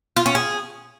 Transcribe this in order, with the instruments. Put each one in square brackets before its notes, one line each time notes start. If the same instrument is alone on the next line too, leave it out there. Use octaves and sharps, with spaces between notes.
[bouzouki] F4
C#4
G#4